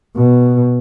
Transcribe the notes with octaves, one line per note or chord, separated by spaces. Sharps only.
B2